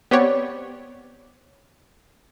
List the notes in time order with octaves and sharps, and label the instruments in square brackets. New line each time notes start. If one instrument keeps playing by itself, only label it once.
[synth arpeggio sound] B3 C4 G4 C#5 D5